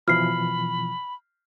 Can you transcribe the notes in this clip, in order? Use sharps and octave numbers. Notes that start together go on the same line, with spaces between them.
B2 E3 F3 B5 F6 C7